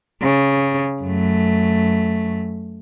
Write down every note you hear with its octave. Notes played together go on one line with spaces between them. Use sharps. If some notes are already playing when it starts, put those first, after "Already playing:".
C#3
F#2 A3